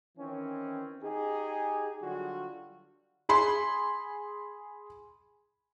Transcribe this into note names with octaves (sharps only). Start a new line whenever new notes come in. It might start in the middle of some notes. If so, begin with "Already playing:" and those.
D#3 E3 C4 C#4
D#4 G4 G#4
D3 F#3 G3 F4 F#4
G#4 B5 C6